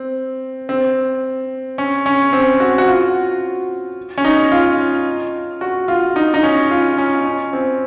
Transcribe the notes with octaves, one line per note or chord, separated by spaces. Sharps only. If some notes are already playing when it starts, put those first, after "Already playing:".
Already playing: C4
C4
C#4
C#4
C4
F#4
F#4
F4
C#4
D#4
F4
F#4
F4
D#4
D#4
C#4
F4
C#4
C#4
C4